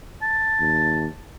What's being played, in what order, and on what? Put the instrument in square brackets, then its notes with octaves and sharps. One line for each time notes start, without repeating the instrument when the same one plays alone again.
[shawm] A5
[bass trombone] D#2